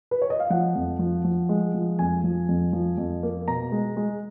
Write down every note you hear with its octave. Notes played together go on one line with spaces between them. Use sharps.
B4
C#5
D#5
F5
F3 F#5
F2
F3
F3
G#3
F3
F2 G#5
F3
F2
F3
F2
A#3
B2 A#5
G#3
G#3